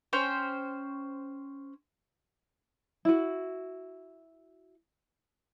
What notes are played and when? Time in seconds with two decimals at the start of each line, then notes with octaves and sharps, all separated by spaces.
0.13 C#4 C5 G5
3.05 E4 F#4